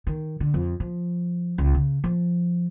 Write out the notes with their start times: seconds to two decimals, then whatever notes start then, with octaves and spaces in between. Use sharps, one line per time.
0.07 D#3
0.40 D3
0.54 F2
0.80 F3
1.58 C#2
1.74 C#3
2.04 F3